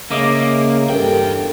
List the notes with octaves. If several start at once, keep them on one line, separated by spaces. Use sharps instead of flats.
C#3 A#3 D#5 E5 D6
E2 G2 A4 A#4 G5